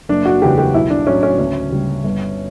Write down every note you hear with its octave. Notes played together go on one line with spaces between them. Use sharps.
F#1 D4
F#4
E2 C#3 G4
G4
B1 E4
D4
A2 F#3 C#4
C#4
D2 C#4
C#3 G3
G1